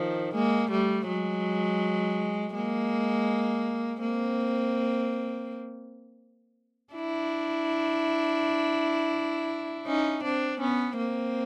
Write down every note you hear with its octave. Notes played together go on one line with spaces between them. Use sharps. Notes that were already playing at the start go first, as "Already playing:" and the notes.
Already playing: D#3 F3
G#3 A#3
G3 A3
F#3 G#3
G#3 A#3
A#3 C4
D4 E4
C#4 D#4
C4 D4
B3 C#4
A#3 C4